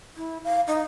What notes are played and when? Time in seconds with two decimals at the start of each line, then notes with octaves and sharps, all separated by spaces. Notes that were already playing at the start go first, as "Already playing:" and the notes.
0.17 E4
0.44 F5
0.67 D#4